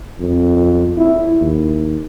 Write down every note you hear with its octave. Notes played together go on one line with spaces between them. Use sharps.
F2
E4
D#2